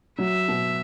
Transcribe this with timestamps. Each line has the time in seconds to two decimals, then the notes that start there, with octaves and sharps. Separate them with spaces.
0.18 F#3 E5
0.48 B2